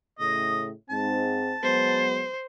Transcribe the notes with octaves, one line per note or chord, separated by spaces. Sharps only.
A2 C#3 D#5
G#2 C4 A5
F#3 G#3 B3 C5